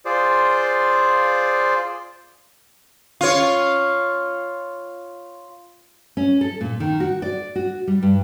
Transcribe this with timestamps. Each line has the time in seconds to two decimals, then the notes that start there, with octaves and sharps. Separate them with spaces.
0.05 F4 G#4 C5 D5
3.21 F4 C#5
6.17 C#4
6.41 A4
6.61 A#2
6.80 D#3
7.00 F#4
7.22 D5
7.56 F#4
7.88 G3
8.03 G2